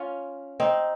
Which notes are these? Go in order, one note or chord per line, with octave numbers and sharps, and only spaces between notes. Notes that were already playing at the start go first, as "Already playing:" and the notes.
Already playing: C#4 F4
C4 D#4